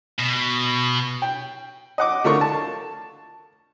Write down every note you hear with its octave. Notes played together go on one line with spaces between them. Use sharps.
B2
G5
D#5 F#5 D6
D3 A3 F4 A#4 C#6
A5